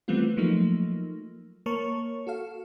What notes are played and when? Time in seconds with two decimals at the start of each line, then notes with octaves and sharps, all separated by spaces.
0.08 E3 G3 A3 B3 C4 F4
0.37 F3 F#3 A3 A#3 D#4
1.66 A#3 A#4 C#5 A5 C#6
2.27 F#4 A4 F5